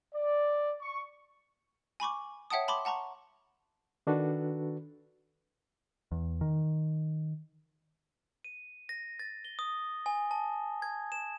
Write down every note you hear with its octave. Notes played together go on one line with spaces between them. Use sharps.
D5
C#6
G#5 B5 C#6 D6
C#5 E5 F#5 G5 A5 D#6
A5 B5 C6 D6
F#5 A5 A#5 C#6
D#3 D4 F#4 A4 B4
E2
D#3
D#7
A#6
A6
G7
D#6
G#5
A5
G#6
E7